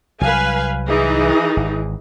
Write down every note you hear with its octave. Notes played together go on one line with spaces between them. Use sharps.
C2 F#3 B4 F5 G#5
E3 D#4 G#4
G#1